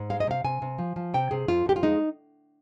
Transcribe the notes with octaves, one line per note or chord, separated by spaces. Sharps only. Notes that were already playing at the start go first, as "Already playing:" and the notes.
Already playing: G#2
G#3 F5
D#5
C3 F5
C3 G#5
C3
F3
F3
C3 G5
C3 G#4
F2 F4
F2 G4
F4
G#3 D#4